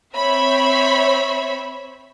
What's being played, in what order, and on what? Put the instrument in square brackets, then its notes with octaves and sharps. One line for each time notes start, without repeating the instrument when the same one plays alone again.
[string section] C4 C#5 E5 B5